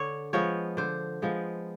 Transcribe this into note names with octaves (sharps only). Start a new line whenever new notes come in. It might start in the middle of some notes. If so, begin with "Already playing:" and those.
Already playing: D3 C#5
F3 G#3 B3 C#5
D3 C5
F3 G#3 B3